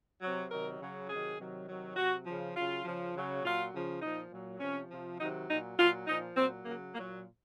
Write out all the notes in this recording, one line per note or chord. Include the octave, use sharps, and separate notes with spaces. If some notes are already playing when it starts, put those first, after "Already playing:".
C3 F#3
C3 D#3 F#3 A#4
C#3 F#3
C3 D#3 F#3 G#4
C3 D#3 F#3
C3 D#3 F#3
C3 F#3 F#4
C#3 F3
C#3 F#3 F4
C#3 F3
C#3 F#3
A#2 F#3 F4
C#3 F3
A#2 F3 D#4
A#2 F#3
C3 F3 C#4
C3 F3
C3 D#3 F#3 D#4
A#2 F#3 D#4
A#2 F#3 F4
A#2 F3 D#4
A#2 F#3 C4
C#3 F#3 A#3
A#2 F#3 A#3